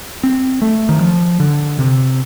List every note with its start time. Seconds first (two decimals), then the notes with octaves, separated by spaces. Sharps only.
0.23 C4
0.62 A3
0.89 D#3
1.01 F3
1.40 D3
1.79 C3